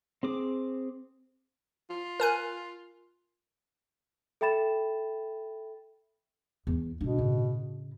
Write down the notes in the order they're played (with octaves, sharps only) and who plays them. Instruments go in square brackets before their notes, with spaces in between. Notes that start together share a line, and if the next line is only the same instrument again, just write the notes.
[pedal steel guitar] C4 G#4 D6
[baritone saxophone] F4
[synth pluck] A#4 G#5 F#6
[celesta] A4 E5 G5 B5 A6 E7
[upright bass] E2
[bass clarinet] B2 [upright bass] D3 D4
[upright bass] A2 C#3